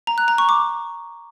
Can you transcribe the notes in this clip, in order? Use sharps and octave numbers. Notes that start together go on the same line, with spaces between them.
A#5
F#6
A#5
C#6
D6